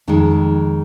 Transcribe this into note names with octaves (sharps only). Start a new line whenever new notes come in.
F2 D#3 G#3